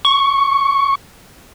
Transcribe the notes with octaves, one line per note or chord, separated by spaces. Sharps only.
C#6